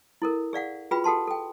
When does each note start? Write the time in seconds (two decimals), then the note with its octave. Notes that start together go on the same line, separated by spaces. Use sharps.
0.22 E4 A4 A#4
0.53 G#4 D5 F5 F#5
0.91 F4 F#4 G#4 B4 G5 B5
1.04 G4 A4 F#5 A5 C6
1.27 A4 G5